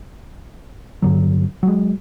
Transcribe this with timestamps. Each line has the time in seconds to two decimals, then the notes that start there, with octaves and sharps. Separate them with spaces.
1.02 G2 D3 F#3
1.63 F#3 G#3